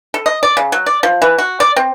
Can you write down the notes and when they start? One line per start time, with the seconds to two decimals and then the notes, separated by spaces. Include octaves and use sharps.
0.14 A4
0.26 D#5
0.43 D5
0.57 C#3
0.72 F#3
0.86 D5
1.03 F3
1.22 E3
1.38 F#4
1.60 D5
1.76 C4